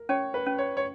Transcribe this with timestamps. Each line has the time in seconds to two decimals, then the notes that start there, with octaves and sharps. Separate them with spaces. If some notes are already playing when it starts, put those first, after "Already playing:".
Already playing: A#4
0.09 C#4 C#5
0.34 B4
0.46 C#4
0.58 C#5
0.77 C#5